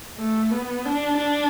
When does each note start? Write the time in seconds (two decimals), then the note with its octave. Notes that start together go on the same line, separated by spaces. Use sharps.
0.18 A3
0.51 B3
0.85 D4
1.18 D4